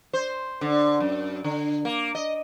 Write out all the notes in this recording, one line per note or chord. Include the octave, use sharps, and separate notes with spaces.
C5
D3
F#2
D3
A#3
D#5